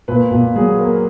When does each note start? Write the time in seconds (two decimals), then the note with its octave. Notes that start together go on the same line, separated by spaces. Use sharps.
0.08 A#2 B4
0.31 A#2
0.56 F#3 G#4
0.79 A#3